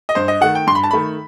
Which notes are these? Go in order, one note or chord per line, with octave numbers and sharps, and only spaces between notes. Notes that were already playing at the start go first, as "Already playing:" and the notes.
D#5
G2 C5
D#5
D#3 A3 F#5
G5
G2 C6
B5
A5
D#3 A3 B5